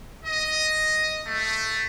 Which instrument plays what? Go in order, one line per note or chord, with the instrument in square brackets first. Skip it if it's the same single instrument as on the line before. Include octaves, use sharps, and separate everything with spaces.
[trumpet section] D#5
A3